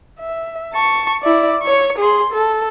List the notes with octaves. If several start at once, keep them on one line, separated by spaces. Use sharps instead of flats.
E5
A5 C#6
E4 D5
C#5 C#6
G#4 C6
A4